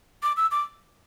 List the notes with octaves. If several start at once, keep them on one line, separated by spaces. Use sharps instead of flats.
D6
E6
D6